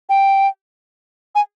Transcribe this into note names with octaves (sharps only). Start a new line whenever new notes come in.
G5
G#5